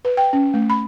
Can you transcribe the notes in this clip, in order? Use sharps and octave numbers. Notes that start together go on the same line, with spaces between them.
B4
G5
C#4
A3
B5